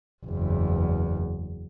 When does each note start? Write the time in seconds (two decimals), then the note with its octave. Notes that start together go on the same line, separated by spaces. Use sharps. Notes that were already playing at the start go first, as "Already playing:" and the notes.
0.25 F#1 E2